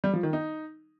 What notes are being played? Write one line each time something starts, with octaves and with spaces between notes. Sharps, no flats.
G3
F3
D#3
D#4